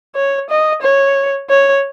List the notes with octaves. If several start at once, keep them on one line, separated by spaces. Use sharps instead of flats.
C#5
D#5
C#5
C#5